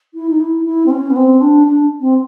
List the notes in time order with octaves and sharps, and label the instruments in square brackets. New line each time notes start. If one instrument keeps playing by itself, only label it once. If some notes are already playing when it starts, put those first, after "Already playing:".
[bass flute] E4
D#4
E4
E4
C4
C#4
B3
C4
D4
D4
C4